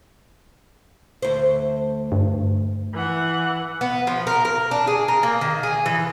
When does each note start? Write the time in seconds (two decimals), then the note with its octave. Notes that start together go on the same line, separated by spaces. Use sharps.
1.22 D2 C5
2.12 G2
2.93 E3 F#5
3.81 B3
4.07 F3
4.27 A#4
4.45 A#4
4.71 D4
4.87 G#4
5.08 A#4
5.23 A#3
5.41 D#3
5.63 G#4
5.86 E3